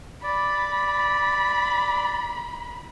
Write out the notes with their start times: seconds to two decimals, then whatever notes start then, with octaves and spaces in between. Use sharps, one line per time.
0.23 D5 B5